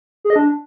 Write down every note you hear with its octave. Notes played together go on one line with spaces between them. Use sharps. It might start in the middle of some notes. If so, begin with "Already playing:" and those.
G#4
D#5
D4